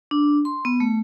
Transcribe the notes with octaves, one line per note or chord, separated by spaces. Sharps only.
D4
C6
B3
A3